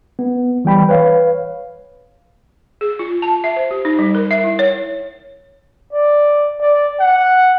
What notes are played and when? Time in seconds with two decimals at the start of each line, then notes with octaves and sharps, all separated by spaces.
0.19 B3
0.65 E3 G3 G5 B5
0.89 B4 C#5 F5
2.81 G#4
2.99 F4
3.22 A5
3.44 E5
3.56 C5
3.71 G4
3.85 D#4
3.99 G3
4.15 A#4
4.31 E5
4.44 E4
4.59 C#5
5.93 D5
6.61 D5
7.00 F#5